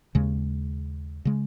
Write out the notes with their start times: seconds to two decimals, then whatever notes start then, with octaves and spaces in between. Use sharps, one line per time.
0.15 D#2 C#3 G#3
1.25 C#3 G#3